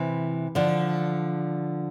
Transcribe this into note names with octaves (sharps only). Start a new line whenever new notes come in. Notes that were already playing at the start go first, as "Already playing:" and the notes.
Already playing: C3 E3
D3 F3